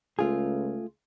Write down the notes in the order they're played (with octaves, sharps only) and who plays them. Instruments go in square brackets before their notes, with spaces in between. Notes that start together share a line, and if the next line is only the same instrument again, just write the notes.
[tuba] C#2 [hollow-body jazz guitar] A3 F4 G#4